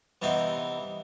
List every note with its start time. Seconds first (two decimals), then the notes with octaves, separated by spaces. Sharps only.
0.22 C3 E3 G3 B3 D#4